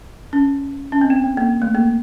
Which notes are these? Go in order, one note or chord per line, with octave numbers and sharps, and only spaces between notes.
C#4
C#4
C4
B3
B3
A#3
A3
A#3